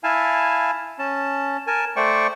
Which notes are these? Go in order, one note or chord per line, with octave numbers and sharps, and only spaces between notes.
E4 F5 G#5 A5
C#4 A5
A#4 G#5 A5
A3 C5 D5 G5 C#6